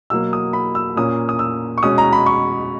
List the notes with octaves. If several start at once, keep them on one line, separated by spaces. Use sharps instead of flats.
B2 F#3 A#3 E6
D#6
B5
E6
A#2 A#3 C#4 D#6
D#6
E6
C#6
B2 G#3 C#4 D#6
A#5
B5
C#6